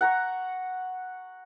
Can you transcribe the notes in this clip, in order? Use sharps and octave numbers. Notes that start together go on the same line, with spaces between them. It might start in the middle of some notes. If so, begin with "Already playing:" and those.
F#5 A#5 C#6